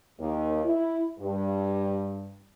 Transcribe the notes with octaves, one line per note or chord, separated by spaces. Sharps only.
D#2
E4
G2